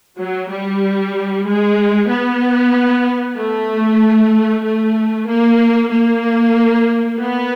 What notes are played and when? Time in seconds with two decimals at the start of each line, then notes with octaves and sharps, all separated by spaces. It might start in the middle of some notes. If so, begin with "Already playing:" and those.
0.18 F#3
0.50 G3
1.46 G#3
2.09 B3
3.37 A3
4.64 A3
5.27 A#3
5.91 A#3
7.18 B3